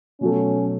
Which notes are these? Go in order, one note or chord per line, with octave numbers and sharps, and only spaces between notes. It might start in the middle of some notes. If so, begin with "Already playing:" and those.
B2 F#3 A3 C#4